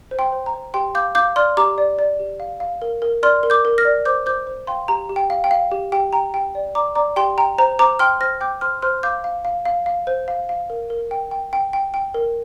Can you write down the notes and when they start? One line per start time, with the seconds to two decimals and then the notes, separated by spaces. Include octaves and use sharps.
0.11 C5
0.19 G5 C6
0.32 C5
0.46 A#5
0.54 C5
0.74 G4 G5 C6
0.95 F5 D6 G6
1.15 F5 D6 G6
1.36 D5 C6 F6
1.57 G4 A#5 D6
1.78 D5
1.99 D5
2.19 G4
2.40 F5
2.60 F5
2.82 A#4
3.02 A#4
3.23 D5 C6 F6
3.43 A#4
3.50 D6 G6
3.65 A#4
3.78 F6 A#6
3.85 D5
4.05 C5 D6 G6
4.26 C5 D6 G6
4.47 C5
4.67 F5 G5 C6
4.88 G4 A#5
5.09 G4
5.16 G5
5.30 F5
5.44 G5
5.51 F5
5.72 G4
5.92 G4 G5
6.13 G5 A#5
6.34 G4 G5
6.55 D5
6.75 D5 A#5 D6
6.95 D5 A#5 D6
7.16 G4 G5 C6
7.38 G5 A#5
7.58 C5 A#5
7.79 C5 A#5 D6
7.99 G5 C6 F6
8.20 C5 F6 A#6
8.41 G5 D6 G6
8.61 C5 C6 F6
8.82 C5 C6 F6
9.03 F5 D6 G6
9.24 F5
9.45 F5
9.65 F5
9.86 F5
10.07 C5
10.28 F5
10.49 F5
10.70 A#4
10.90 A#4
11.11 G5
11.31 G5
11.53 G5
11.73 G5
11.94 G5
12.14 A#4